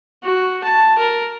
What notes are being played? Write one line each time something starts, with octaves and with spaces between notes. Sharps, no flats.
F#4
A5
A#4